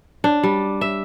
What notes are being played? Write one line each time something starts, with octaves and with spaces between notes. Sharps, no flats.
D4
G3
E5